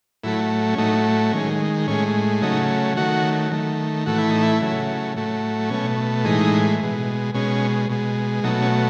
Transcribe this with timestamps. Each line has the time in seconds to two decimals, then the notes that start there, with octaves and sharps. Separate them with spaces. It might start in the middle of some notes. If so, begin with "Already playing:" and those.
0.23 A2 F#3 A3 E4
0.74 C#4
0.78 A2 F#3 A3 D#4
1.32 D#3 G#3 C#4
1.87 A2 G#3 C#4
2.42 C#3 F#3 A3 D#4
2.97 D#3 F#3 A3 F#4
3.51 D#3 A3
4.06 A2 E3 A3 F#4
4.18 E4
4.30 D#4
4.42 E4
4.61 C#3 F#3 A3
5.16 A2 F#3 A3
5.70 B2 A3 C#4
6.25 A2 E3 G#3 D#4
6.80 B2 G#3
7.34 B2 G#3 C#4
7.90 B2 G#3
8.44 B2 F#3 A3 D#4
8.62 C#4